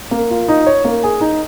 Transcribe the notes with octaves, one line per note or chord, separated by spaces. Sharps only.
A#3
F4
D#4
C#5
A#3
G#4
D#4